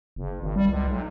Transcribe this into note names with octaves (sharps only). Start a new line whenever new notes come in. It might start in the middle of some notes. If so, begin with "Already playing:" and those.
F#1
G#1
G3
C#2
B1